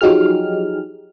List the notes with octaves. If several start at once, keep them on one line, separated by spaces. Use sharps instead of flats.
F3 F#3 D#4 G4 G#4 F6